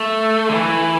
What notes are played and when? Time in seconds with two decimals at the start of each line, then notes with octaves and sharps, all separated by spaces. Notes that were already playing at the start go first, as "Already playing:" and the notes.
Already playing: A3
0.49 D3
0.54 E3